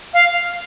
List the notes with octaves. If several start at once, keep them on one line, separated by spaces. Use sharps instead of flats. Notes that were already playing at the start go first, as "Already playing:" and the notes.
F5